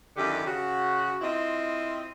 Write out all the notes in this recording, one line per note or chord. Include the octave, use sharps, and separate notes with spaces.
F#2 D3 D#3 E4 G4
C#3 F#4
C4 E4 F4 D#5